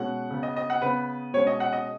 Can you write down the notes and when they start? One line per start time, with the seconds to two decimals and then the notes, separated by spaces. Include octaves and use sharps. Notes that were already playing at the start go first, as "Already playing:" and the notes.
Already playing: B2 G#3 C#4 F#5
0.30 C#3 B3
0.43 D#5
0.56 D#5
0.70 F#5
0.82 C#3 B3 B4
1.34 B2 G#3 C#4 C#5
1.47 D#5
1.60 F#5
1.73 D#5